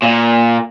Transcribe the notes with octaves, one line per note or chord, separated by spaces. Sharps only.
A#2